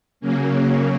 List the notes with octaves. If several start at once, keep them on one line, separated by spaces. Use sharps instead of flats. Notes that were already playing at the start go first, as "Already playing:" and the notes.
C#3 F#3 A#3 C#4